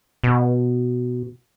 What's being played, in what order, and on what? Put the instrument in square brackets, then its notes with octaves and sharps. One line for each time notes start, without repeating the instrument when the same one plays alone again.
[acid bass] B2